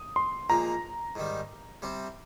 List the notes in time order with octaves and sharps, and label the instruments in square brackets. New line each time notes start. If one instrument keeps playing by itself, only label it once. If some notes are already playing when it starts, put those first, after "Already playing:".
Already playing: [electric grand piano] D#6
C6
[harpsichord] A#2 F3 G#3 [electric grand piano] A#5
[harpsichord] G#2 D#3 G3
C3 G3 C4